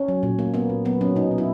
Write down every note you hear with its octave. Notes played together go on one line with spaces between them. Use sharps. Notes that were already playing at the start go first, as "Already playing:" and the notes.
Already playing: C#4
F#3
A#2
A#3
A#3 B3
A#2
F#3 B3
F#3 C#4
B2 D#4
F#3
E4